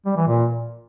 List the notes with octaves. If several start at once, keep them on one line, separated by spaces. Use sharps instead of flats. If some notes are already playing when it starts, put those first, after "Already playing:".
G3
E3
A#2